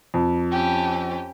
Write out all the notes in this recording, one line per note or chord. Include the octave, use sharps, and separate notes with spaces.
F2
C#4 G4